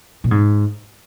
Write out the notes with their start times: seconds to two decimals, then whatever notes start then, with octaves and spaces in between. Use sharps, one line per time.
0.24 A#2
0.31 G#2